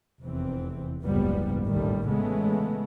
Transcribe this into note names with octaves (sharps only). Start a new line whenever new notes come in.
F1 E2 E3 C4
F#1 C#2 G#2 F3 G3 B3
A1 D#2 B2 D#3 G3 A3
C#3 E3 G#3 A3 B3